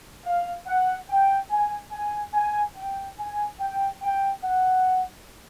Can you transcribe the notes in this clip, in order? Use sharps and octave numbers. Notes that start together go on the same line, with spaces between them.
F5
F#5
G5
G#5
G#5
G#5
G5
G#5
G5
G5
F#5